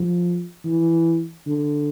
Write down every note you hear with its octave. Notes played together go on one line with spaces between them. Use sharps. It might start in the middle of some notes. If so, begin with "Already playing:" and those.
Already playing: F3
E3
D3